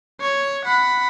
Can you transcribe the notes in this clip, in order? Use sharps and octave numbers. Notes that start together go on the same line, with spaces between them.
C#5
F#5 B5